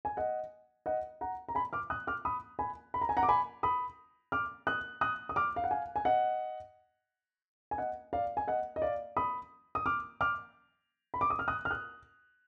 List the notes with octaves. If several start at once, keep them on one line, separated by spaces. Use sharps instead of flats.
G#5
D#5 F#5
D#5 F#5
F#5 A#5
A#5
G#5 B5
D6 F6
D#6 F#6
D6 F6
B5 D#6
G#5 B5
B5
A#5
G#5
F#5 A#5
D6
G#5 B5
B5 D#6
D6 F6
D#6 F#6
D#6 F#6
D#6
D6 F6
F5
F#5
F5 G#5
G#5
D#5 F#5
G#5
D#5 F#5
D5 F5
G#5
D#5 F#5
D#5
D5 F5
B5 D#6
D#6
D6 F6
D6 F6
B5
D6
D#6
F6
D#6 F#6
F6
D#6 F#6